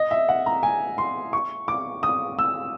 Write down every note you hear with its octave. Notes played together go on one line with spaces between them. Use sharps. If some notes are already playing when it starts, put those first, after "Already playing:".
Already playing: D#5
E5
F#5
A#5
G#5
C6
C#6
D6
D#6
E6